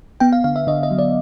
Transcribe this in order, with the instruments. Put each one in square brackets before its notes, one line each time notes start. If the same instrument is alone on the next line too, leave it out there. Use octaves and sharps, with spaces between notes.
[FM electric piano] B3 G5
F5
D3 F5
E5
D3 D#5
D#5
F#3
D5